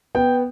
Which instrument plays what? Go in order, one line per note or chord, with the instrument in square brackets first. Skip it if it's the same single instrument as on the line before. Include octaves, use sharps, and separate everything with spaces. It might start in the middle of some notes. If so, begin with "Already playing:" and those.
[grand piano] B3 G5